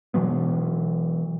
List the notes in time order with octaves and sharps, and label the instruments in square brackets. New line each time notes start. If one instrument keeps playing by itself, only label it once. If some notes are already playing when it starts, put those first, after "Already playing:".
[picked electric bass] B2 E3 F#3 B3